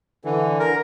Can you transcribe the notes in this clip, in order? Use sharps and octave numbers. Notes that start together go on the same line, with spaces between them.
D3 E3
A#4